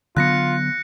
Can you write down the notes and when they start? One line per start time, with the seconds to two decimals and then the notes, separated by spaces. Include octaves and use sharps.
0.17 D3 F#3 B3 F4 F#6 A#6 C#7